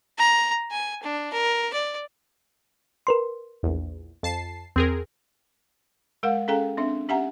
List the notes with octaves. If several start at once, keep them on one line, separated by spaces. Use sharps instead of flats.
A#5
G#5
D4
A#4
D5
A#4 B4 C6
A#1 E2
F2 A5 C7
E2 C4 G#4 A#4
G#3 A#4 F5 F#5
C#4 G#4 A4 F5 G5 A#5
C4 D4 E5
C#4 G4 E5 F#5 G#5 A#5